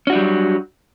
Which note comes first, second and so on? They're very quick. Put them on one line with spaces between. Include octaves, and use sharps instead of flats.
C#4 F#4 D4 G3 F#3